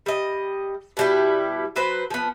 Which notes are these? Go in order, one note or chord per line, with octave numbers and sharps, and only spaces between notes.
G3 D#5
B2 G3 E4
F#3 B4 C5
F3 B3